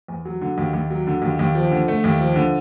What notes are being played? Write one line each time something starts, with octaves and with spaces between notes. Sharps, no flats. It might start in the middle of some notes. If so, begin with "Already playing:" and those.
E2
F#3
D3
D#2
D#2
F#3
D3
D#2
D#2
F3
D3
A3
D#2
F3
D3